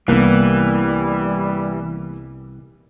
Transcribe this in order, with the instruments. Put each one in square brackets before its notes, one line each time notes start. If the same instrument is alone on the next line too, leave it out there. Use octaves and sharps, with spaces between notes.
[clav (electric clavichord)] C2 [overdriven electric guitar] E3 [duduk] G3 [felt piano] A#3 B3